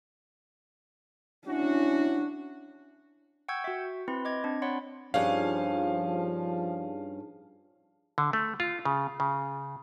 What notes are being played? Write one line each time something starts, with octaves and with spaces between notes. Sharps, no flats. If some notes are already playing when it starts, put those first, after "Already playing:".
C#4 D4 E4 F#4
F#5 G5 C#6 E6 G6 G#6
F#4 E5
C4 E4 B4 C6
D#5 D6 G#6
C4 D4
C#5 D5 F#5 B5 C6
G2 F3 C#4 D#4 G#4 F5 A5
D3
A3
F4
C#3
C#3